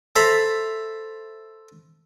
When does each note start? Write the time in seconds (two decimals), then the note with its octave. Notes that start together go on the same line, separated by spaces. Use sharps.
0.16 A4 C5 E5 A#5 B5